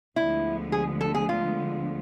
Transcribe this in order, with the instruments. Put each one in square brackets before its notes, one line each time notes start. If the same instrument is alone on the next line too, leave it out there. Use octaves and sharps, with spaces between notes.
[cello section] D2 D3 F3 G#3 B3 [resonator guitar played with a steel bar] E4
[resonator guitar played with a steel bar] G#4
A4
G#4
F4